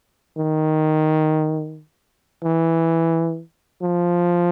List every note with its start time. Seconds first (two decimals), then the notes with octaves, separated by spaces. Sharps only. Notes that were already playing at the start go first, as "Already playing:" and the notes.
0.38 D#3
2.45 E3
3.83 F3